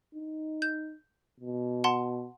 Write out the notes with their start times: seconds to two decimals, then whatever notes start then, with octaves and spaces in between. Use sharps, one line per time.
0.15 D#4
0.62 G6
1.40 B2
1.84 F#5 A5 C6